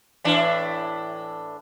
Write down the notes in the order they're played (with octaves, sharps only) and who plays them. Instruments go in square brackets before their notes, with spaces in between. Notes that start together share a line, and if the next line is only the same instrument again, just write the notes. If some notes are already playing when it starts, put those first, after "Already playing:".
[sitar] A2 E3 D4